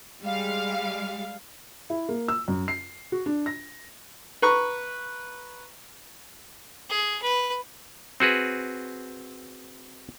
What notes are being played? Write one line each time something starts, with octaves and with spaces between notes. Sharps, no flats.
G3 G#3 F5
E4
A#3
E6
F#2
C7
F#4
D4
A#6
B4 A#5 C#6
G#4
B4
C4 F#4 G#4 B4